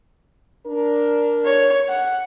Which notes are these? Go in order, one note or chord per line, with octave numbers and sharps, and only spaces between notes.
D4 A#4
C#5
F#5